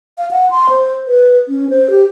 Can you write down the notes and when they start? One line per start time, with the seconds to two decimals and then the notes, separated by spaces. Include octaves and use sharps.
0.18 F5
0.31 F#5
0.51 C6
0.70 C5
1.07 B4
1.48 C#4
1.70 C5
1.90 G4